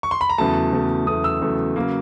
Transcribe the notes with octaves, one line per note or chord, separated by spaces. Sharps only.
C#6
C6
B5
A#5
E2 C#3 F#3 A3 A5
E2 C#3 F#3 A3
E2 C#3 F#3 A3 D#6
E6
E2 C#3 F#3 A3
C#3 F#3 A#3